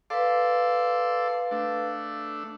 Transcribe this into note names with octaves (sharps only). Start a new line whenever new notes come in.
A4 B4 D5 F5 C6
A3 D4